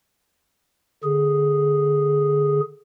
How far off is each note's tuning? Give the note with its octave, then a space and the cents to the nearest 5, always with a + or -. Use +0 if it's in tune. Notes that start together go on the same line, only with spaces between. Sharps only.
D3 +0 G#4 +0